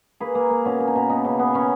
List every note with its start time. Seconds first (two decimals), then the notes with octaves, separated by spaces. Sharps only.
0.20 A#3 G#4 B4
0.35 A#3
0.50 A#3
0.65 B2 C#4
0.80 A#3
0.88 D#4
0.95 B2
1.09 B3 D#4
1.25 C#3
1.39 B3
1.54 C#3 C#4